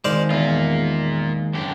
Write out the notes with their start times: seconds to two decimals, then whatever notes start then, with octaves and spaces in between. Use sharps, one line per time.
0.04 D#3 G#3 C5 D5 F5
0.31 E2 A#3 F4
1.54 F#2 D3 G4